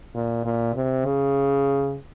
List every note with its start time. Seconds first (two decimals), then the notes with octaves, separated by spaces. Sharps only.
0.15 A#2
0.45 A#2
0.75 C3
1.05 C#3